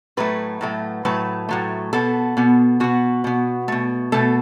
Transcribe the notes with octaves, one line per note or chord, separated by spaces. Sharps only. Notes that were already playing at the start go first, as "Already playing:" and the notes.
A2 F#3 A3 B4
A2 F#3 A3
A2 F#3 A3 B4
A2 F#3 A3
B2 B3 A4
B2 B3
B2 B3 F#4
B2 B3
B2 A3
B2 A3 A4